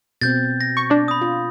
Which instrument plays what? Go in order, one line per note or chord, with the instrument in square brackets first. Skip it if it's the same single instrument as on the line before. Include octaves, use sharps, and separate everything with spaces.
[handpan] B2 C4 [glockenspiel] G6 A6
[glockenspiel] A#6
[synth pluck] C#6
D4 D5
[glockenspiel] B5 D#6
[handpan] F4